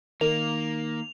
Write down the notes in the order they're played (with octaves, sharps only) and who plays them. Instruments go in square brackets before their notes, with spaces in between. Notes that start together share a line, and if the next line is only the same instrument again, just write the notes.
[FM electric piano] D#3 D#4 [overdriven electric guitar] A#3 [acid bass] A#4 [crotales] F7